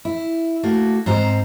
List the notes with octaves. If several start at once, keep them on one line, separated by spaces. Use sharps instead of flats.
E4
A3 A#3 F#4
G#2 C4 C5 A#5